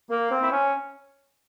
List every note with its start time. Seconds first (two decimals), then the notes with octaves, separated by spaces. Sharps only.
0.10 A#3
0.31 C4
0.43 E4
0.52 C#4